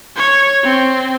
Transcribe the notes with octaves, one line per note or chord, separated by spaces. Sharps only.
C#5
C4